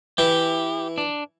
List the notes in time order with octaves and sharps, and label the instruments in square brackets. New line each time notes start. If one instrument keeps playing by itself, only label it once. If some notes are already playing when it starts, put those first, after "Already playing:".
[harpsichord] E3 [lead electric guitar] G4
[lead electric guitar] D4